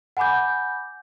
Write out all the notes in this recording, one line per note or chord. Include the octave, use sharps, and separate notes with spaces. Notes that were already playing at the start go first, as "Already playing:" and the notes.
F#5 G#5 B5 D6 G6